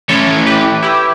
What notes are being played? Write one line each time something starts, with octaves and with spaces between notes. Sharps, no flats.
E3 A3 C#4 E4 A4 C#5
G4 B4
E4 G4